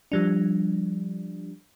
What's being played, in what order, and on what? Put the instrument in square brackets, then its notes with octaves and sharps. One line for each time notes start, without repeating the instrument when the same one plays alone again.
[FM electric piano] F3 G3 D4